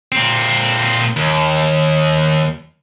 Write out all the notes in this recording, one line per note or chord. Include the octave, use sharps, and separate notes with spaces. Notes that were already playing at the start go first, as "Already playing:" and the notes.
A#2 C4
D#2